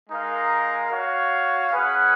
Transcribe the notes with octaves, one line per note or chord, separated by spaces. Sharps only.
G#3 D#4 A#4 F5
F#4 C#5 F5
C#4 G#4 B4 F#5